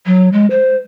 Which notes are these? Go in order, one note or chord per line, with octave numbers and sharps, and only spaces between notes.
F#3
G#3
C5